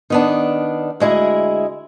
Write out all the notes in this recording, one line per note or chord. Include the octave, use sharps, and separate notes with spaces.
D#3 B3 D4
D2 G#3 E4 G#4